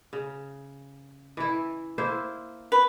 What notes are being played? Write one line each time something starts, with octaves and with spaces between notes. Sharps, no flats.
C#3
E3 E4
A#3 E4 C5
B4